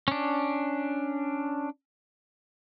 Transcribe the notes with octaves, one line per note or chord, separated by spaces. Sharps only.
C#4 D4